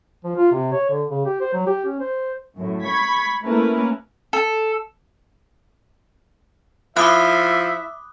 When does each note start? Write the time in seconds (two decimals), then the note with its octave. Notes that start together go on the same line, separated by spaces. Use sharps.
0.24 F3
0.36 F4
0.52 C3
0.72 C#5
0.90 D3
1.10 C#3
1.26 G4
1.41 C5
1.53 F#3
1.67 G4
1.85 C#4
2.00 C5
2.55 F#2 A2
2.84 B5 C#6 G#6 B6
3.43 A3 A#3 C#4 E4 A#4 B4
4.33 A4
6.96 F3 E4 E5 D6 D#6 F#6